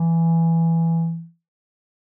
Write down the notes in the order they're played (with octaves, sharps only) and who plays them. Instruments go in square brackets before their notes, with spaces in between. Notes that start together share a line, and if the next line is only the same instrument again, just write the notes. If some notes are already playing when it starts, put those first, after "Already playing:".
Already playing: [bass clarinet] E3